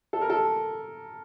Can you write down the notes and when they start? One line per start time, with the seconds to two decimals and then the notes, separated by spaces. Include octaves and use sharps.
0.13 A4
0.21 A#4
0.30 A4